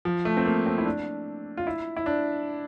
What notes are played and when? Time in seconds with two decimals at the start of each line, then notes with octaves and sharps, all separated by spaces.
0.05 F3
0.25 A3
0.37 C4
0.46 A#3
0.66 C4
0.78 E4
0.85 D4
1.57 F4
1.67 E4
1.96 E4
2.06 D4